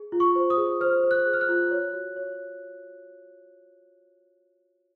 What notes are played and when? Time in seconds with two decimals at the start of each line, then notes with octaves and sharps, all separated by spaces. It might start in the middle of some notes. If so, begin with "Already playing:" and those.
Already playing: G#4
0.12 F4
0.20 C#6
0.36 C5
0.50 D#6
0.57 G#4
0.81 C5 F6
1.03 C5
1.11 F#6
1.26 G#4
1.34 F6
1.41 F#6
1.49 F4
1.71 C#5
1.94 F#4
2.16 C#5